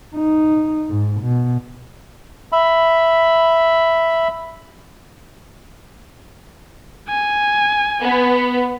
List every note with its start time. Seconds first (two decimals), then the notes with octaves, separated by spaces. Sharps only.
0.15 D#4
0.89 G#2
1.20 B2
2.52 E5 B5
7.09 G#5
8.03 B3